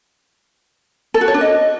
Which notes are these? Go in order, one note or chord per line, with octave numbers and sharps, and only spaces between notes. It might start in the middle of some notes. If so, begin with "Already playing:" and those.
A4
F#4
C#5
D4
D#5